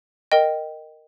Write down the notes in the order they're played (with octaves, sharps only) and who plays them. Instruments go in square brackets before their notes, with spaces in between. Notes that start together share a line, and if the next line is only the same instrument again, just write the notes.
[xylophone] A#4 D#5 G5